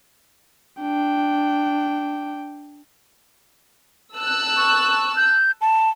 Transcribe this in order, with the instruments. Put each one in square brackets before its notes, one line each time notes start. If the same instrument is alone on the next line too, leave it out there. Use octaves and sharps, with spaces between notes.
[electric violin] D4 G5
[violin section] A5 E6 F#6
[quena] C#6
G6
A5